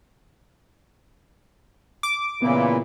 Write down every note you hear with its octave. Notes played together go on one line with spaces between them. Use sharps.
D6
A#2 C#3 E3 B3 E4